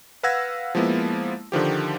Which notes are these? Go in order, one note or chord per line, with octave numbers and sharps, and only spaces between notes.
B4 F5 F#5 E6 G#6 A#6
F3 G#3 A#3 B3 E4
D3 D#3 F3 G4